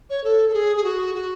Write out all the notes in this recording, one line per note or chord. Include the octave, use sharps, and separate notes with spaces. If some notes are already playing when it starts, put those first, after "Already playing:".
C#5
A4
A4
G#4
G#4
F#4
F#4